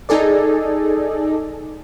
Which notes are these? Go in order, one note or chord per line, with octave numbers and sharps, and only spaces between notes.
D#4 G#4 A4 D5